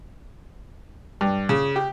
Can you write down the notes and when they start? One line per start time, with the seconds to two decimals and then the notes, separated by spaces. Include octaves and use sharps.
1.21 G2
1.49 C#3
1.76 G4